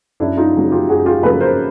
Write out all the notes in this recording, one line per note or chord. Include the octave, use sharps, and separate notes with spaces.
F#2 D4 E4
D#4 F4
C#3 F#3 A#3
F4 G4
F#2 F#4 G#4
F4 G4
C#3 F#3 A#3 A4 B4
A#4 C5